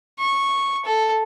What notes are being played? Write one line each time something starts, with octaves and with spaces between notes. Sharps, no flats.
C#6
A4